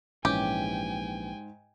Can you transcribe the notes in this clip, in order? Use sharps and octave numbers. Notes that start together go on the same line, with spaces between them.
A#1 G#2 E3 C#4 G4 G5 G#5